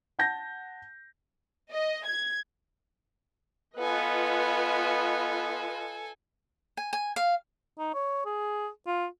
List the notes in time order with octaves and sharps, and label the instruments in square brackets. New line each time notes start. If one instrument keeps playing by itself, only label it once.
[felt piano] F#5 A5 G6 A#6
[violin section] D#5
G#6
[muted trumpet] B3 [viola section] F4 B4 D#5 [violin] A4 G#5
[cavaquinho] G#5
G#5
F5
[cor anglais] D#4
C#5
G#4
F4